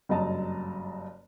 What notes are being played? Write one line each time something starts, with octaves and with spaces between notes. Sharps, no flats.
F#1 G2 F#3 D#5 A5 A#5